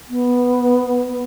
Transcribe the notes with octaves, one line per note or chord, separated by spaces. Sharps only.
B3